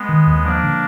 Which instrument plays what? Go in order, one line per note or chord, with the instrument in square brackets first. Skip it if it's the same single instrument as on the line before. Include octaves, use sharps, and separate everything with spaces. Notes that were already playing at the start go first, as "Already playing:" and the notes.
Already playing: [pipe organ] G#3 B3
[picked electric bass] D#3
D#2
[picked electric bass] F3 [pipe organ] A#3 D4
[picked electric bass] D3